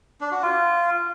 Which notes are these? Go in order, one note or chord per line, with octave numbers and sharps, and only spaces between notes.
D4
F#4
F4